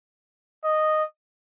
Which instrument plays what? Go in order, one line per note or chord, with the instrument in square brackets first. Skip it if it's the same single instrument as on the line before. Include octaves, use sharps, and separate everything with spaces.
[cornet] D#5